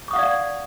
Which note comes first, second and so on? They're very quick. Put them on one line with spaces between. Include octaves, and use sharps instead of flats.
C#6 D#6 F#5 F5 D5